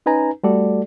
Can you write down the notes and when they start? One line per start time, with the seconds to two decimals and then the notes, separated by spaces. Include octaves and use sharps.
0.06 C#4 D#4 B4 G#5 A#5
0.43 G3 A3 F#4 A4 D5